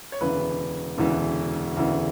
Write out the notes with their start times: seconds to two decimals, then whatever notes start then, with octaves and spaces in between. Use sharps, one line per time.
0.12 C#5
0.21 E1 D2 C#3 E3 B4
0.98 E1 D2 C#3 E3
1.77 E1 D2 C#3 E3